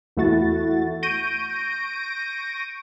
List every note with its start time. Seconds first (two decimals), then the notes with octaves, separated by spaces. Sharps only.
0.17 E2 A3 E4 F#4 A6
1.03 C#6 G6 A#6 D7 D#7